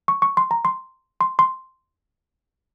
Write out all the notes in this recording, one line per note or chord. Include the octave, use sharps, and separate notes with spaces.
C#6
C#6
C6
A#5
C6
C6
C6